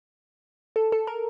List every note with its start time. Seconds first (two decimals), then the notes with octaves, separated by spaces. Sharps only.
0.76 A4
0.92 A4
1.07 A#4